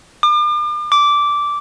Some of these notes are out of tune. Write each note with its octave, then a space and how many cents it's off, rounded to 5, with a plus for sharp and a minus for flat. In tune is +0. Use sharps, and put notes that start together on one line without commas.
D6 +40
D6 -10